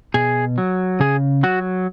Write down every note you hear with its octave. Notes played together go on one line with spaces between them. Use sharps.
B2 G#4
F#3
C#3 G#4
F#3 F#4